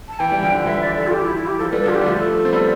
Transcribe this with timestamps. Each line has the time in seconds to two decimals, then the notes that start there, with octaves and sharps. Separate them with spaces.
0.09 A5
0.19 E3 G5
0.32 G3
0.43 D3 F3
0.66 E3 G3 E5
0.81 D5
0.97 A4
1.07 F4
1.13 G4
1.25 E4
1.36 E4
1.47 G4
1.59 F3 A4
1.71 G3 B4
1.82 A4
1.86 D3 F3 F4
1.94 G4
2.01 G3
2.06 F3 A3 A4
2.45 C4
2.53 G3 B3